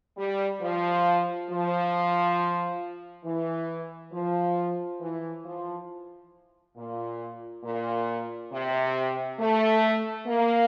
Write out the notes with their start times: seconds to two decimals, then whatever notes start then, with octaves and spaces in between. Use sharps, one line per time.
0.17 G3
0.61 F3
1.49 F3
3.25 E3
4.12 F3
5.00 E3
5.45 F3
6.76 A#2
7.64 A#2
8.52 C3
9.39 A3
10.27 A#3